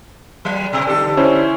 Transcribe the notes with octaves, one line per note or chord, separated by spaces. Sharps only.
F#3
B2
D3 G4 A4
C#4 E4 C5